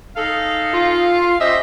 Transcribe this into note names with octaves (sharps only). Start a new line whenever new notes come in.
D#4 G#4 A4 F5
F4
C#4 G4 C5 D#5 E5